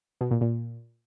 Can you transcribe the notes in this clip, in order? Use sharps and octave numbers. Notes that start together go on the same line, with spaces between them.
B2
A#2
A#2